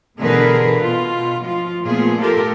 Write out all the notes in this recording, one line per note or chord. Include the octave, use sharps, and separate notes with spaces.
B2 D3 E3 G#4 A#4 B4
B2 F4
F3 F4
A#2 F3 A3 B3 F4 G#4
A3 F4 G4 A4 A#4